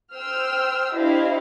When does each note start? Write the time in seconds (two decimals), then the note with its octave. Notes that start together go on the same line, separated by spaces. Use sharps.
0.14 C5 G5 E6 F6
0.93 D4 E4 G4 C5 D#5 F5